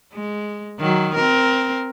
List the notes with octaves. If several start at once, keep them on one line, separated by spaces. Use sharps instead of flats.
G#3
D#3 F#3
C4 A#4